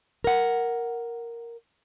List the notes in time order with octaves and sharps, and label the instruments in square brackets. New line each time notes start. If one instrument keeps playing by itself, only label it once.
[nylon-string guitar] A#4 F#5